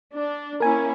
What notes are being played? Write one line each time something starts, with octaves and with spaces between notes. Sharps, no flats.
D4
A#3 C#4 E4 A#4 G#5